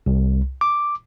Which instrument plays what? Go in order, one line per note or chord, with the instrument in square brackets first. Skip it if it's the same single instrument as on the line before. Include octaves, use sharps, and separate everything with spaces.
[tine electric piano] C2
D6